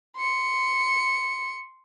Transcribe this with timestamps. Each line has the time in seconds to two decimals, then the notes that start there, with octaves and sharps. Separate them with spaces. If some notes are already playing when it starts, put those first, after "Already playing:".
0.17 C6 C#7